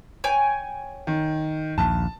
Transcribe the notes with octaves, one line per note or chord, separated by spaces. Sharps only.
C#5 G5 G#5
D#3
A#1 D#2 A5